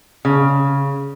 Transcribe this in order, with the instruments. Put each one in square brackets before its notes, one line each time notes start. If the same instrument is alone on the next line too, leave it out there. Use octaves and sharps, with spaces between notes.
[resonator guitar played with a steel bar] C#3